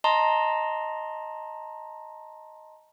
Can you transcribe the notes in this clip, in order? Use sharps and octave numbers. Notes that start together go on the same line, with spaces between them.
D#5 A5 A#5 C6